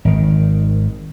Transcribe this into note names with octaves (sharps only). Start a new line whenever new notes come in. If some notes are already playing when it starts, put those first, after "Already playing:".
G#1 D#3